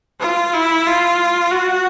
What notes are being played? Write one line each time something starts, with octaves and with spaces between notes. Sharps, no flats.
F4
E4
F4
F#4